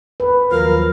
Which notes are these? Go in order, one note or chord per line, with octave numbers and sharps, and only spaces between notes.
B4
D#2 F3 F#3 A#4 F5